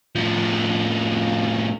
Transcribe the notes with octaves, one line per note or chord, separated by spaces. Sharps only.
A2 F3